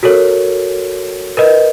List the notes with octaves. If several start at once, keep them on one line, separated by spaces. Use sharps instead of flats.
F#4 A4 A#4 C#5
A#4 B4 D#5